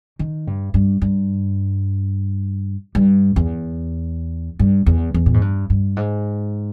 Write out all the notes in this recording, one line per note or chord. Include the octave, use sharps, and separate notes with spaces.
D#3
G2
G2
G2
G2
E2
G2
E2
E2
A#2
G#2
G2
G2
G#2